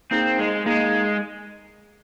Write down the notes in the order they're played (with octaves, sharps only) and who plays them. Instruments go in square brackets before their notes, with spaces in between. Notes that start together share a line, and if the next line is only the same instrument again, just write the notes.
[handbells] A#3 D#4 G#4 [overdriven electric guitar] C4
[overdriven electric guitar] G#3
[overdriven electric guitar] G#3 [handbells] A#3 D#4 G#4